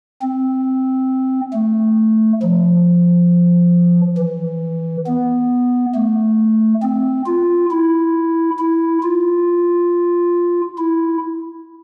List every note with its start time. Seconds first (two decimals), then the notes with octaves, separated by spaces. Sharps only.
0.22 C4
1.53 A3
2.43 F3
4.18 E3
5.07 B3
5.95 A3
6.82 C4
7.26 F4
7.71 E4
8.59 E4
9.03 F4
10.78 E4